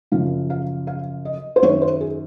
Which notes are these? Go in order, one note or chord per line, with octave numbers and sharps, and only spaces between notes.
F#2 C#3 F3 F5
F5
F5
D#5
C5
F#2 D#3 C#5
C5
G#4